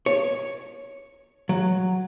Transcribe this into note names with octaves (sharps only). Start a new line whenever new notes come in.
C#5
F#3